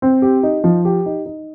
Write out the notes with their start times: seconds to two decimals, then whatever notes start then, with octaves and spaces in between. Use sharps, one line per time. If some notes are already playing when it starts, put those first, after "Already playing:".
0.02 C4
0.22 G4
0.43 D#4
0.64 F3
0.85 G4
1.06 D#4
1.26 D#4